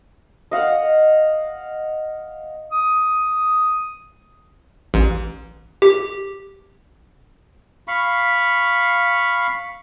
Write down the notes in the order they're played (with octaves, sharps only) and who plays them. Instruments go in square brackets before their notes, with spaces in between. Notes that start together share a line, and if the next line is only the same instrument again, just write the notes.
[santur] D#5 F5 F#5
[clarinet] D#6
[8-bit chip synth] A1
G4
[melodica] F5 B5 C#6